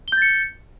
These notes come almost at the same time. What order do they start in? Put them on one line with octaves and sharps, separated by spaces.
G7 G6 A6 C#7